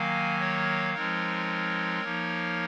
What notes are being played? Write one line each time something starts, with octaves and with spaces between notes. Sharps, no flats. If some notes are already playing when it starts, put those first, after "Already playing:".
Already playing: D#3 F#3 A#3 F5 G#5
C#5 F5
F3 G#3 C4 D#4 A#4 C#5
F3 A#3 D#4